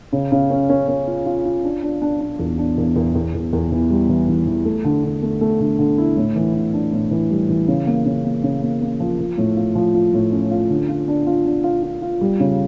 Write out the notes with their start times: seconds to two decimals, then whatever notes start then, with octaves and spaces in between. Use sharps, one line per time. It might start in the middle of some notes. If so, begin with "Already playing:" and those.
0.13 C#3
0.32 C#3
0.50 C#4
0.70 C#4
0.88 C#4
1.07 F4
1.26 F4
1.45 F4
1.64 D4
1.83 D4
2.02 D4
2.21 D4
2.39 E2
2.58 D4
2.77 E2
2.96 E2
3.15 E2
3.34 E2
3.53 E2
3.71 E3
3.90 G3
4.09 E3
4.28 E3
4.47 E3
4.65 A3
4.84 D3
5.04 D3
5.22 A3
5.41 A3
5.60 D3
5.79 D3
5.98 E4
6.17 A2
6.36 E3
6.55 E3
6.73 D4
6.93 A2
7.11 E3
7.30 G3
7.49 E3
7.68 C#3
7.87 A#3
8.06 C#3
8.25 A#3
8.43 C#3
8.62 A#3
8.81 A#3
9.00 F3
9.19 F3
9.38 A2
9.56 F4
9.75 F3
9.94 F4
10.14 A2
10.32 C#4
10.51 F4
10.70 D3
10.89 F4
11.08 D4
11.27 F4
11.46 D4
11.64 F4
11.83 F4
12.02 F4
12.21 G3
12.40 C#3